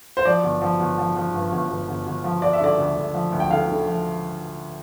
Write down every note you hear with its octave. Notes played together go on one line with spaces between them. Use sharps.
C5
F3 D5
G1
F3
G1
F3
F3
G2
G1
G1
G1
G1
F3
F3 D5
E5
D3 D5
D2
D2
F3
D2
G5
D3 F5
D3
F3